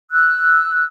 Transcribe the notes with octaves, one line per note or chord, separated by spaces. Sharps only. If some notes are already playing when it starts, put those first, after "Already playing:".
E6 F#6